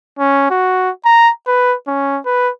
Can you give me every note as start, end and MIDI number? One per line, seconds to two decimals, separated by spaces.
0.19 0.48 61
0.50 0.90 66
1.05 1.31 82
1.47 1.75 71
1.88 2.19 61
2.25 2.50 71